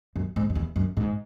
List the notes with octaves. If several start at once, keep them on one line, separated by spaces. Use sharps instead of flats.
F#2
G#2
F#2
E2
F#2
G#2